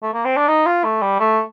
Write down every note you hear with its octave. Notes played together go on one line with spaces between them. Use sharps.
A3
A#3
C4
D4
D#4
F4
A3
G3
A3